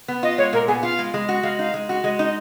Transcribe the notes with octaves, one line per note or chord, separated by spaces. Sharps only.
B3
F4 D#5
G#3 C#5
A#2 A#4
B3 G#4
F4 F5
G#3
G#3
F#4
G#3 F5
D#4 F5
G#3
F#4
G#3 D#5
D#4
D#5